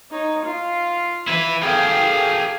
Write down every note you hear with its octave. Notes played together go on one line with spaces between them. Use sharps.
D#4 C#5
F4 F5
E4 B4
G#4 A4 F5 G5